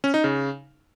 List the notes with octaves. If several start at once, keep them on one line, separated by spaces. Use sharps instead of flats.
C#4
D#4
C#3